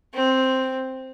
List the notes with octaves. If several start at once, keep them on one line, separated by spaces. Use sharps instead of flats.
C4